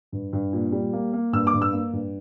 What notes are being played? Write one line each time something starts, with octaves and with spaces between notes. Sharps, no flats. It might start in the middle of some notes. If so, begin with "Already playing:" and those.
G2
G2
A#2
G3
A#3
A#3
G2 E6
D6
G2
E6
A#3
G2